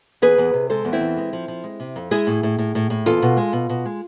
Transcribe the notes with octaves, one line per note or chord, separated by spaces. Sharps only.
E2 G#4 B4
E2
C3
G#3 A4 C5
E2
C4 E4
E3
G#3
F3
F3
G#3
C3
F2
G#3 E4 G#4
A2
A2
A2
A2
A2
E2 F4 A4
B2
G#3
B2
B2
G#3